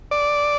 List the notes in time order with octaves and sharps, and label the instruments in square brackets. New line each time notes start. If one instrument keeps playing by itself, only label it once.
[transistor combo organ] D5